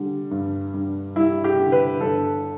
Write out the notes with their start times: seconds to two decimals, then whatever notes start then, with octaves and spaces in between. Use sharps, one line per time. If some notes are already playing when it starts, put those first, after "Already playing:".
Already playing: D3 G3
0.31 G2
0.74 G2
1.16 G3 E4
1.44 G4
1.59 D3
1.72 B4
2.00 G1 A4